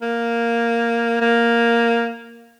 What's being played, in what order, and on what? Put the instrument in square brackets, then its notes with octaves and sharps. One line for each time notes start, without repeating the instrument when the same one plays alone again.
[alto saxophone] A#3
A#3